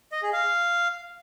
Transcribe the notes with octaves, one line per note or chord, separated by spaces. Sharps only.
D#5
G#4
F5